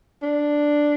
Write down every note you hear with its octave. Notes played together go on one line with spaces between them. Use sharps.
D4